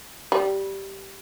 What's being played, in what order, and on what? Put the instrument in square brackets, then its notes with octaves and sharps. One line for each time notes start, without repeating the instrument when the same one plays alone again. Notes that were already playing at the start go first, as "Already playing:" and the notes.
[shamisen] G3